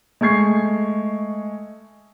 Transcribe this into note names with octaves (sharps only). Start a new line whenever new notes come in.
G#3 A3 C#6 G#6 C7